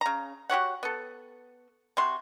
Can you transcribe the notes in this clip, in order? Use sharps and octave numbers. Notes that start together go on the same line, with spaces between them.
C#3 A#5
F#4 G4 C#5 F#5
B3 A4
C3 F#4 C6